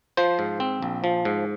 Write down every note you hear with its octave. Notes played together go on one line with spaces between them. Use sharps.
F3 C5
G#2
C4
A#1
F3
G#2